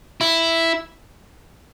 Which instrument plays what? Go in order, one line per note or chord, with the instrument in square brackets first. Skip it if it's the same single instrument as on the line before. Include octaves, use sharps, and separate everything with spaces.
[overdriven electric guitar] E4